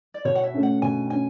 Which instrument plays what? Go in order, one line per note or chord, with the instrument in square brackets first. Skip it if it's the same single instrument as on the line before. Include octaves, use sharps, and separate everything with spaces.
[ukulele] D5
[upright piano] B2 [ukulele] C#5
[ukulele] F#5
E5
[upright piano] A3 C#4
[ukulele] F#5
[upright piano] B2 [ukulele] G#5
[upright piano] C#4 [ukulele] G#5